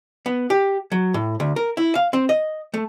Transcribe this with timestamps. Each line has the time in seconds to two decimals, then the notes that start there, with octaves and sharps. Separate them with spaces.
0.26 B3
0.50 G4
0.92 F#3
1.14 A2
1.40 D2
1.56 A#4
1.77 E4
1.95 F5
2.13 C4
2.29 D#5
2.74 A3